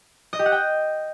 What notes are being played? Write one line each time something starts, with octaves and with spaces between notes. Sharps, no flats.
D#5
G4
F#5
G5